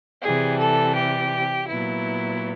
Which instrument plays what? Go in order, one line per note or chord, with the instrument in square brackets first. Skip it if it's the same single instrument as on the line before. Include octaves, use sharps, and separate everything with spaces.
[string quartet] C3 E3 G3 G#4
A4
G4
A#2 F#3 B3 E4